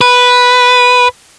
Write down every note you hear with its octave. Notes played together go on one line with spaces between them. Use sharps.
B4